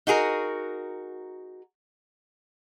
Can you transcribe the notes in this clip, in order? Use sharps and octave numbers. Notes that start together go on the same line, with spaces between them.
D#4 F#4 G#4 A#4